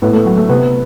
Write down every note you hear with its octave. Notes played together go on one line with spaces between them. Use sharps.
A2 B3
A3
F#3
A3
C3 B3